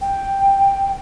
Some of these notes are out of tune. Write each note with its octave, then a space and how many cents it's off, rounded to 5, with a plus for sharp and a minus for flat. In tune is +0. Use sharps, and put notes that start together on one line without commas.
G5 +5